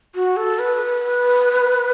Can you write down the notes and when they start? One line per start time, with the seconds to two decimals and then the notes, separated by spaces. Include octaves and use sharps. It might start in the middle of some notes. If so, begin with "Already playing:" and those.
0.15 F#4
0.37 A4
0.59 B4